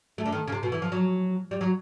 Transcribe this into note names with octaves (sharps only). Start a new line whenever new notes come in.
A3
D3
D#3
C#3
C3
B2
E3
F3
F#3
G3
F#3